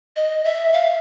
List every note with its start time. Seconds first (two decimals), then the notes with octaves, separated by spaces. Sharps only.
0.16 D#5
0.44 E5
0.73 F5